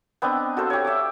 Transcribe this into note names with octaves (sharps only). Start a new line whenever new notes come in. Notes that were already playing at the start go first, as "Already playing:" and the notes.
B3 C4 D4 D#5
F#4 A4 C5 F5
G4 C#5
E5 D6